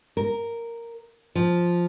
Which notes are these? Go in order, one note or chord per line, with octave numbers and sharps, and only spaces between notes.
A#4
F3